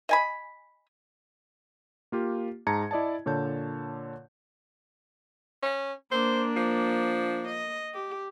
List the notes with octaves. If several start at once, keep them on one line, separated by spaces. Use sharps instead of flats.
D#5 G#5 B5
A#3 F4 G4
G#2 G#4 A5 A#5 G#6 C#7
E4 D5 D#5 A5
A#2 D3 C#5 A5 G6
C#4
A#3 D4 C5
F3
D#5
G4